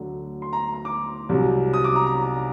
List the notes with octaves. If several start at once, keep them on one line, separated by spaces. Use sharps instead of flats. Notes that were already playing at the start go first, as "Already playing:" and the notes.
Already playing: D2 D3 F#3
C6
A#5
A#5
D6
C2 C3 F#3
D#6
D6
A#5
A#5